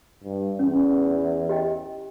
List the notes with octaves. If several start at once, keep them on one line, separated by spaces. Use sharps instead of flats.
G2
E2 C#4
G4 D#5 G5